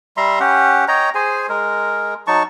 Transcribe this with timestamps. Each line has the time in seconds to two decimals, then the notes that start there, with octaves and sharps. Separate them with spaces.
0.17 G3 E5 A#5 C6
0.40 C#4 G4 F#5
0.88 C#5 D#5 G5 A#5
1.15 G#4 C5 G#5
1.49 G#3 A#4
2.27 F#3 D#4 A5 C#6